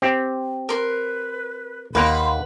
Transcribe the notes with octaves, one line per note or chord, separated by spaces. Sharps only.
C4 G4
A#4 B4 C6
D#2 A#3 A#4 B4 F#5 B5 C6